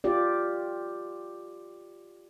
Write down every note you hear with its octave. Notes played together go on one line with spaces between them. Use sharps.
F4 G4 D5